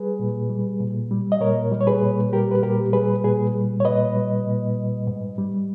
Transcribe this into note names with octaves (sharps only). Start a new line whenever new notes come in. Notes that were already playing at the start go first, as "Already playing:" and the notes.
Already playing: G3 G#4 B4
A#2
G3
A#2
G3
D#5
A#2 A#4 C#5
G3
C#5
G#4 B4
A#2
G3 G4 A#4
B4
A#2 G4 A#4
G3 G#4 B4
A#2 G#4 B4
G3
C#5
A#2 B4 D#5
G3
A#2
G3
G#2
G3